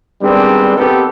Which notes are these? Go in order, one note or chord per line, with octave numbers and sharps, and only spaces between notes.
D#3 G3 G#3 B3 C4 D4
D#3 B3 C4 G4 A4 A#4